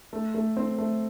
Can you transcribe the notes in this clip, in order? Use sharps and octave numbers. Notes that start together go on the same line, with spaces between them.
A3
A3
C4
A3